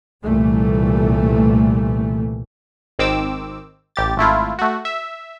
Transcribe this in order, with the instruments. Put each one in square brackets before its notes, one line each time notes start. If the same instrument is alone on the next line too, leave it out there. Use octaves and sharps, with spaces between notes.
[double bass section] C2 A#2 E3 G3 A3
[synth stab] G#1 D#3 C4 D6 E6
A1 G4 A6
G#1 A3 E4 F4
A3 F#4
E5